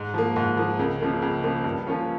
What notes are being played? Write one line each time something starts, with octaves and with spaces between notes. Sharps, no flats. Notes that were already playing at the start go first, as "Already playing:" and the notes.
Already playing: G#2
F3 A#3
G#2
F3 A#3
C#2
C#3 F3 A#3
C#2
C#3 F3 A#3
G2
F3 A#3 C#4 F4